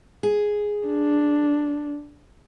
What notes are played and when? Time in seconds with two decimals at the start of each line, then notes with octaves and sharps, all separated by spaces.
0.23 G#4
0.87 D4